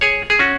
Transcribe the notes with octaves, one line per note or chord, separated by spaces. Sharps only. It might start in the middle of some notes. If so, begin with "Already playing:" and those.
G#4 C#5
G#4
C#4 F#4